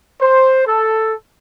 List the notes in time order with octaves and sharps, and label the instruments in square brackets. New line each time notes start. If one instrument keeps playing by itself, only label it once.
[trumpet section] C5
A4